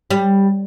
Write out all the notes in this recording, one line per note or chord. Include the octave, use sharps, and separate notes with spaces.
G3